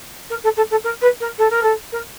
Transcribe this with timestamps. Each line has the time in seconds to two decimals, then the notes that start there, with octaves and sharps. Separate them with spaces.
0.30 A#4
0.43 A4
0.57 A4
0.71 A4
0.84 A#4
1.02 B4
1.21 A#4
1.38 A4
1.50 A#4
1.63 A4
1.92 A#4